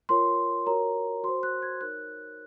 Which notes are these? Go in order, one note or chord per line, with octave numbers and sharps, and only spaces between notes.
F4 A#4 C#5 C6
F#4 A#4 C#5 A#5
F#4 C5 C6
F#6
G#6
D#4 A#4 C#5 F#6